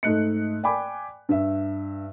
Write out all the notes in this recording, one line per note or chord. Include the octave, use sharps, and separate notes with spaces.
G#2 A3 D#5 F#6 C#7
D5 G5 G#5 B5 D6
G2 E5